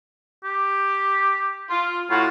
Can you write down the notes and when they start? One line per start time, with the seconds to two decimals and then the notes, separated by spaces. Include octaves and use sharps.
0.44 G4
1.70 F4
2.10 A2 F4 F#4